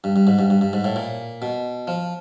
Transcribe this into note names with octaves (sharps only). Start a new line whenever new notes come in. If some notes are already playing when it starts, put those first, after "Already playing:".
G2
G2
G#2
G2
G2
G2
G#2
A2
A#2
B2
F3